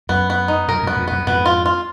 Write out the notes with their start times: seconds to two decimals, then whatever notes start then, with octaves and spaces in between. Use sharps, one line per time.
0.09 F#2 B3
0.30 B3
0.48 D#4
0.68 F#2 A#4
0.83 F#2 B3
0.97 F2
1.08 F#2 B3
1.27 F2 G#2 B3
1.46 F4
1.66 F4